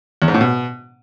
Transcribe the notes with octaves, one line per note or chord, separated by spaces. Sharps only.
E2
G#2
A2
B2